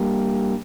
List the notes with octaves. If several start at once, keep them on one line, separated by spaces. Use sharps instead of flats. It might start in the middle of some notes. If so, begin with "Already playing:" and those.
Already playing: G3 A#3 D4